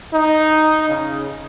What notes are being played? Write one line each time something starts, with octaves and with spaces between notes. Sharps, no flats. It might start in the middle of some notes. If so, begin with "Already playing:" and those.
D#4
C#3